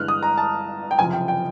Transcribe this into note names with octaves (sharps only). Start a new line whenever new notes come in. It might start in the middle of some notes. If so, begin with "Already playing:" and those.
Already playing: G1 G2 E3 G#3 F6 F#6
D#6
A#5
A5
G5
F#1 F2 C3 F3 G#5
G5
G5